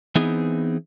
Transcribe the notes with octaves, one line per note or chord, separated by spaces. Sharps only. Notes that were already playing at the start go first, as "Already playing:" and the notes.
E3 B3 C4 D#4 G#4